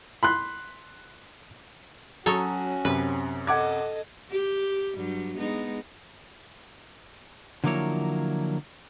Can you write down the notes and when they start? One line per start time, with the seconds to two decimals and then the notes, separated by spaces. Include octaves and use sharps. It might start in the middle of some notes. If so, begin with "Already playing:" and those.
0.23 B5 C6 F#6
2.26 F#3 C#4 F#4 A4 C#5 A#5 D#6
2.85 F#2 C3 B4
3.47 A4 D#5 F#5 D6 G#6
4.31 G4
4.96 G2 F#3 G3
5.37 G#3 B3 D#4
7.64 D3 F3 F#3 A#3 E4 C#5